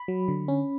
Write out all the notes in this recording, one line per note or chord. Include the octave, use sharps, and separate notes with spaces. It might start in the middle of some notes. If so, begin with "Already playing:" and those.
Already playing: B5
F#3
D3
C#4